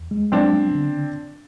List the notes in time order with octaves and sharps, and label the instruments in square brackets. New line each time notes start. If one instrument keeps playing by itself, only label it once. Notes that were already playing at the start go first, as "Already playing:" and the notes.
Already playing: [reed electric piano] E2
G#3
[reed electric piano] F#3 [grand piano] C4 D4
[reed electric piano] B3
D3